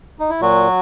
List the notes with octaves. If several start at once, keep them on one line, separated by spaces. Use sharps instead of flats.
D#4
E4
A#2 F#3 F#4